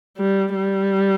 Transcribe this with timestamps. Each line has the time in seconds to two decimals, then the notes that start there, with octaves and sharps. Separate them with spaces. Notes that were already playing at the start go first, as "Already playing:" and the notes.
0.18 G3
0.56 G3